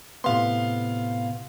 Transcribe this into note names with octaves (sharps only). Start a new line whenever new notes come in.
A2 C3 B3 F5 C6